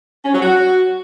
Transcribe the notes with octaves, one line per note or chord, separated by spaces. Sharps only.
C#4
F#3
F#4